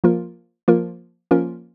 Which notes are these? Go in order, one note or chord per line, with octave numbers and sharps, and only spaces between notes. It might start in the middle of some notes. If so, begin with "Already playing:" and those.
F3 A#3 F4 A#4
F3 A#3 F4 A#4
F3 A#3 C#4 F4 A#4